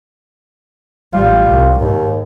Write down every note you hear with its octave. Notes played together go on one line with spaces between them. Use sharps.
A1 G3 F4
C2
D#2 G#2